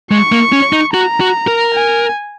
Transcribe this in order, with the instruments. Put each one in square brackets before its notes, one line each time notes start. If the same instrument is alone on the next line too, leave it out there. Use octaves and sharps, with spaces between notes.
[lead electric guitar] G#3 [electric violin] C#6
[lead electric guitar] A#3
C#4
D#4
[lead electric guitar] F#4 [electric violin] A#5
[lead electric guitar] F#4
A#4
[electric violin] G#5